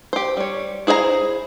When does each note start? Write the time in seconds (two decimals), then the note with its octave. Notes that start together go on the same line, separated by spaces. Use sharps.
0.13 G4 C5
0.37 G3 C#5
0.87 E4 G#4 C5 E5 A#5